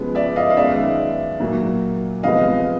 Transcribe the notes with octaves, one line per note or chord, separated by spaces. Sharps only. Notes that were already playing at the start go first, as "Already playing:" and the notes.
Already playing: C#3 F3 G#3 B3
D5 E5
D#5 F5
F5
F#2 D#3 G#3 B3 D5 E5
A#2 F#3 A#3
C3 F3 G#3 B3 D#5 F5